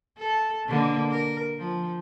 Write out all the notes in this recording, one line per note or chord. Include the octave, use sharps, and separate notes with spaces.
A4
B2 D3 A#3
A#4
F3